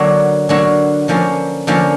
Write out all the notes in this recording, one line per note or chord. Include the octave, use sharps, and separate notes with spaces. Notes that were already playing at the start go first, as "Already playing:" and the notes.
Already playing: D3 F#3 A#3 D4 F#4
D3 F#3 A#3 D4 F#4
D3 F3 A#3 C#4
D3 F3 A#3 C#4